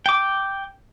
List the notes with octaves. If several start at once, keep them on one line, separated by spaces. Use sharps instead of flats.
G5 D6